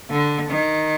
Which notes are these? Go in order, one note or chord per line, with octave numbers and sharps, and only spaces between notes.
D3
D#3